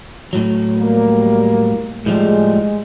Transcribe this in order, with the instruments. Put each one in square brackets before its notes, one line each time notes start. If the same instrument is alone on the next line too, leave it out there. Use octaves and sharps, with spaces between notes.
[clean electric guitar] A2 F#3
[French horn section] G3 A#3
[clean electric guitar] A2 F3 G3 [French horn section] G#3